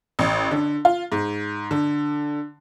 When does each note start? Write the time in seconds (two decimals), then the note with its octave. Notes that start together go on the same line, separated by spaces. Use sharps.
0.19 A1
0.51 D3
0.85 F4
1.12 G#2
1.71 D3